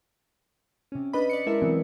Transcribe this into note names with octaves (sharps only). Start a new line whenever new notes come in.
C3 C#4
D4 B4 D#5 B5
D5 C#7
G#3 E4 A4 A#4 E5
C3 E3 F#3 B3 C4